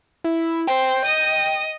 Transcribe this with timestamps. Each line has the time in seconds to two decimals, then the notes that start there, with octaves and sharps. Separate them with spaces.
0.24 E4
0.67 C5 G5
1.05 D#5 D#6